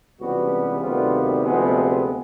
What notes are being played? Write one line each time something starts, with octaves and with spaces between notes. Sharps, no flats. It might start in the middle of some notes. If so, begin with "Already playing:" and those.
C#2 C3 E3 G3 B3 F#4
D2 C3 D#3 G3 B3 F4
D2 C3 F3 G#3 B3